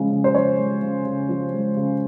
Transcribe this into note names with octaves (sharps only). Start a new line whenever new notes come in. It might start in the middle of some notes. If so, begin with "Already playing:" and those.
Already playing: C#3 F3 G#3
C#3
C5
F3 C#5
G#3
C#3
C#3
F3
G#3
C#3